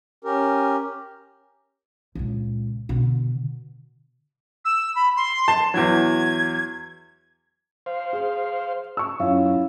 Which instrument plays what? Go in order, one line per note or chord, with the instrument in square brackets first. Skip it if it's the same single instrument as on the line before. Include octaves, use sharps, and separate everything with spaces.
[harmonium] C#4 G4 A#4
[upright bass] C#2 A#2
B2 D3
[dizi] E6
B5
C6
[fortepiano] A5
[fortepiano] E2 E3 F#3 [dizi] G#6
[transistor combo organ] C5 F5
[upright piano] G#4
C#6 E6
[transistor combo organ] F#2 [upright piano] C#4 E4 F4